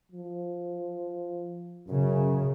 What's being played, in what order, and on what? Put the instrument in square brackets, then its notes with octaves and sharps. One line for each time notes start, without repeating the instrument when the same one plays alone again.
[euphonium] F3
[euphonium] F#2 [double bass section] C#3